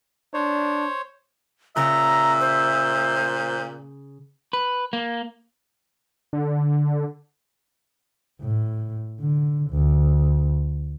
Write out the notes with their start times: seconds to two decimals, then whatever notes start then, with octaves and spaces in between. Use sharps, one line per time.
0.34 D4 C5 C#5
1.76 A#2 C#3 E5 A#5
2.41 C5
4.53 B4
4.93 A#3
6.33 D3
8.41 A2
9.20 D3
9.71 D2